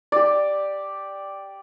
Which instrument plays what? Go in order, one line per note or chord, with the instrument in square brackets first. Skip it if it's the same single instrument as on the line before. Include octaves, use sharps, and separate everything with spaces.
[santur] G4 D5